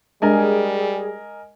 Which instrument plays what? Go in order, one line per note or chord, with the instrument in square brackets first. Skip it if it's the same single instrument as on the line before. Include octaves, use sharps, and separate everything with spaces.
[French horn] G3 [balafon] G#3 D4 [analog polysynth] G#4 [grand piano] A#4 D#5 G#5